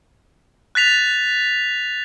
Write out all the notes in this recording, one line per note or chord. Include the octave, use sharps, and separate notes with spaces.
F#6 A6 B6 F7